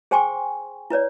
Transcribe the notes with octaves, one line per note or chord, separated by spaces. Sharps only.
G#4 C5 G5 G#5 C6 C#6
E4 B4 C#5 D5